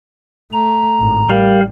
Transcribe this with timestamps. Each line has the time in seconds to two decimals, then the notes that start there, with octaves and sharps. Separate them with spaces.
0.52 A3 A#5
1.00 G#1 A2
1.30 A1 G3 A#4 F5